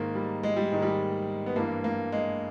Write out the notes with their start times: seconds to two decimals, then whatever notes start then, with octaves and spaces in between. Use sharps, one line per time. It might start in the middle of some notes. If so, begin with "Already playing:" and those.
Already playing: G#2 D#3 A#3
0.15 G3
0.43 G#3
0.56 G3
0.72 G#2 D#3
0.82 G3
1.46 B3
1.56 G2 E3 A#3
1.84 A#3
2.12 G#3